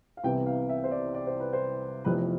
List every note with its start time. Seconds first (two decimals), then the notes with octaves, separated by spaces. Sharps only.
0.17 F5
0.23 C2 C3 E3 B3 G5
0.46 F5
0.69 E5
0.84 C5
0.91 D5
1.14 D5
1.27 C5
1.40 B4
1.53 C5
2.05 F1 F2 E3 B3 B4